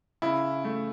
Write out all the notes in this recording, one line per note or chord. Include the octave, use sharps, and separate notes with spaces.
C#3 E4
A3